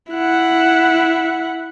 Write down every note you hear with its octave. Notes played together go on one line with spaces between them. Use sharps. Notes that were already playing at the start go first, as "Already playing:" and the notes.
E4 F#5